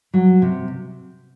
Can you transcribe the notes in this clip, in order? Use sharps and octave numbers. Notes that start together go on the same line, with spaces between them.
F#3
C3